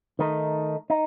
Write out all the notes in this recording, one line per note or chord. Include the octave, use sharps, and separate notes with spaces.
D#3 A3 D#4
D#4